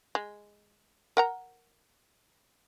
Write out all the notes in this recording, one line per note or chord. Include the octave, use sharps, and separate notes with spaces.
G#3
A#4 F#5 A#5